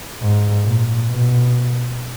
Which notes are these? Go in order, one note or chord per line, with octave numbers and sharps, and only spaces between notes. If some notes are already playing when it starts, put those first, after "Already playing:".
G#2
A#2
B2